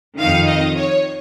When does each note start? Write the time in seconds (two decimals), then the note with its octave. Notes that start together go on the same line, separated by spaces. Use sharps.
0.18 F2 D#3 F5
0.47 D#5
0.76 C#5